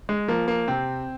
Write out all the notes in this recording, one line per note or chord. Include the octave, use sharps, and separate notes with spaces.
G#3
F3 A#3
A#3
C3 C4